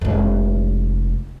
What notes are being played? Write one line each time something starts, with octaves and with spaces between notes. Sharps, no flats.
F1 G#3